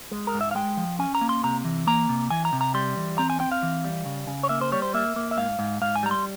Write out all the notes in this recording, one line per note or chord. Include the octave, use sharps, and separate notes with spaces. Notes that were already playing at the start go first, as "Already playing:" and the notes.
G#3
A#4
G#2
E5
F5
G#3 G5
F3
C#4 G#5
A#5
A#3
C6
C3 A#5
E3
A#3 A#5
C3
E3 G#5
A#5
C3
A#5
G3 C6
E3
C4 A#5
G#5
C4 G5
F5
E3
G3
C#3
C#3
C#5
A#3 E5
C5
G3 C#5
C5
A#3 E5
A#3
E5
G#2 F5
G#2
G#2 F5
G#5
G3 A#5
C6